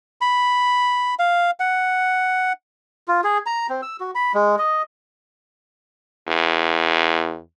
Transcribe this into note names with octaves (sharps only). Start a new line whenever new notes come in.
B5
F5
F#5
F4
G#4
A#5
C4
E6
F#4
B5
G#3
D#5
E2